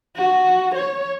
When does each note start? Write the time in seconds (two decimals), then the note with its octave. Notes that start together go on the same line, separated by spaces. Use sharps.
0.17 F#4
0.76 C#5